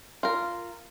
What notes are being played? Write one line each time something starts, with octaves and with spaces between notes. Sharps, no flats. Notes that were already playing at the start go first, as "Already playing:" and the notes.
F4 A#4